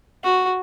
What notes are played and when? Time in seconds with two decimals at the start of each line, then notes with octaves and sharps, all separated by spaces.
0.24 F#4